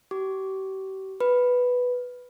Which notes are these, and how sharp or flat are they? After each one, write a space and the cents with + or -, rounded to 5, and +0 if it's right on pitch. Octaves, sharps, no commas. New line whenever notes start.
G4 -40 D6 -20
B4 +0 B5 +0